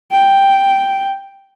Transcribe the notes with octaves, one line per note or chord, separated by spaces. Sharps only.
G5